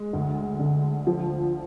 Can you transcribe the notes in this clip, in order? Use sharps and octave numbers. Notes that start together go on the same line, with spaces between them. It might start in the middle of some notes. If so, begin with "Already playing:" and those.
Already playing: G#3
D2
D3
F3